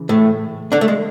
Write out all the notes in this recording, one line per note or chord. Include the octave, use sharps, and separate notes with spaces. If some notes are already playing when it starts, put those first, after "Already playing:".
Already playing: C#3 E3
A2 A3
D3 D4
A3
G#3